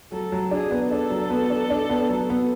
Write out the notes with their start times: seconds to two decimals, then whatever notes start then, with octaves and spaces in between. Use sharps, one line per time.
0.12 F#3 A4
0.32 F#3
0.51 D4 G#4
0.71 B3
0.91 D4 A4
1.10 F#3
1.30 B3
1.50 D4
1.70 D4
1.90 B3
2.09 F#3
2.30 B3